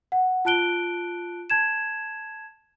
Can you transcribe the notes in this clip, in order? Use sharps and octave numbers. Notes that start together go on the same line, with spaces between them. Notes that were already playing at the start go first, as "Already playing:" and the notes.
F#5
F4 A5 F#6 D7 G7
A5 G#6 E7